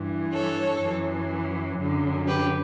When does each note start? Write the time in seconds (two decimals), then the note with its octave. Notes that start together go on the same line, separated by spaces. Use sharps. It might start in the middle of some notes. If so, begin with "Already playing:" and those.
Already playing: G2 E3
0.33 A4 C#5
0.82 F#2 E3
1.79 F#2 D3
2.28 G4 B4